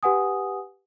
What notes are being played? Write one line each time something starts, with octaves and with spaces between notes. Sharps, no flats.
G4 B4 F#5 G#5 D#6